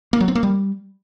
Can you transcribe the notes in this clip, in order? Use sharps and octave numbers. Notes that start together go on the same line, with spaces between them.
A#3
F#3
C4
A#3
G3